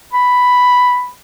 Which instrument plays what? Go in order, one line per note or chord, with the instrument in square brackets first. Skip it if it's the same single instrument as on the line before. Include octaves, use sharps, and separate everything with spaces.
[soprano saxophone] B5